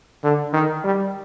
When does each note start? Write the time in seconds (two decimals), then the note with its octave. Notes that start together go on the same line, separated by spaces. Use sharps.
0.24 D3
0.53 D#3
0.84 G3